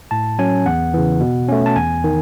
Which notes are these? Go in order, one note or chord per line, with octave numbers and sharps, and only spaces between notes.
A2 A5
F#3 C#4 G#5
E2 F#5
C#3 E3
B2
A3 C#4
A5
E2 G#5
D#3